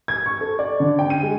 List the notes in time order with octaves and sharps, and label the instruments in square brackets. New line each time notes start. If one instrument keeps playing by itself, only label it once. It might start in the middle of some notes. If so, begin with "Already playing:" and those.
[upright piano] G#6
C#6
A4
D5
D3
G5
D#7
G#3